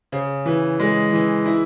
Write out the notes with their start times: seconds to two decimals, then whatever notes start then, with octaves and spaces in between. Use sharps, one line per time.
0.12 C#3
0.46 E3
0.80 G#3
1.13 E3
1.46 E4